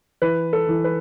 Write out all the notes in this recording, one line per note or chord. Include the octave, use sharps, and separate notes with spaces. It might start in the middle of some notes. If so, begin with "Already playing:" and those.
E3 B4
A4
E3
B4